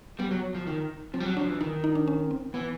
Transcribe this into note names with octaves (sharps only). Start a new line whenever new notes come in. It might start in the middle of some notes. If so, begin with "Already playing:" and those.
G3 B3
F#3
F3
D#3
F3 C4
G3
F#3
F3 D4
E3
D#3 D#4
D#4
D4
C#4
C4
E3 B3